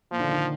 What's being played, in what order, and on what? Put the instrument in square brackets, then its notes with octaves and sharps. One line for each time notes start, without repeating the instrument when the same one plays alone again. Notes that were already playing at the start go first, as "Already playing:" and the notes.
[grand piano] A#2 [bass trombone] F3
[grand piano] D3
D#3
D3